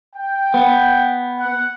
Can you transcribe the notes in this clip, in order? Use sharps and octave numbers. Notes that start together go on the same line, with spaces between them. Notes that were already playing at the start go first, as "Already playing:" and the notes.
G5
B3
F#5